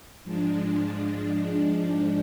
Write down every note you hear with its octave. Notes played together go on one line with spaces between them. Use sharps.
G#2 F3 G#3 D4